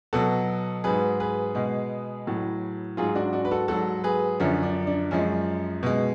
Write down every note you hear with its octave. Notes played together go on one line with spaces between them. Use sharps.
B2 F#3 F#4 A4
G#2 F#3 G#4 B4
G#4 B4
B2 G#3
A2 F#3
G#2 F#3 F4 G#4
D4 F#4
D4 F#4
B4
F#4 A4
G#2 F#3 F#4 A4
G#4 B4
F#2 D3 F3 C#4
D4
D4
F#2 F3 G#3 C#4
B2 G#3